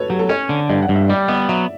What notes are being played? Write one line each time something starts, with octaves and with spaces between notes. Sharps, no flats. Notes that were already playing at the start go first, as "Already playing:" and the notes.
Already playing: F#4 A4 B4 C#5
F#3 G4
A4
C#4 C#5
D3
G2 D5
F#5
G2
E5
G3 D5
B3 D5
F#3 E5